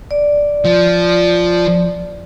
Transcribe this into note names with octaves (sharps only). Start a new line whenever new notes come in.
D5
F3